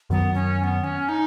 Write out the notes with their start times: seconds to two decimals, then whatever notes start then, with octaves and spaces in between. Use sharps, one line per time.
0.10 F#2 D#3 F#3 B3
0.34 C#4
0.59 C#4
0.63 B3
0.84 C#4
1.09 D#4